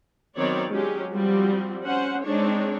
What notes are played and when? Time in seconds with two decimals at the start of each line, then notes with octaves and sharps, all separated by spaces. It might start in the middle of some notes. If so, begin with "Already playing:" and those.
0.36 D#3 F#3 B3 C4 C#5 D5
0.70 F#3 G#3 C#4 G4
1.12 F3 G3 C4 F#4
1.85 C#4 C5 F#5
2.24 G#3 C4 D4 D#4 C#5